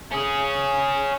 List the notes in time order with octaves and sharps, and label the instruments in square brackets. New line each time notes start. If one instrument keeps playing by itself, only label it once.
[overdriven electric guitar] C#4 G#4